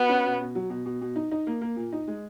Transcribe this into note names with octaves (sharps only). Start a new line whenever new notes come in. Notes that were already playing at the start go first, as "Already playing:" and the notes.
Already playing: B3 F#4
C#4
B2
B2
F#3
B2
B2
B2
D#4
D#4
A#3
A#3
A#2
D#4
G#3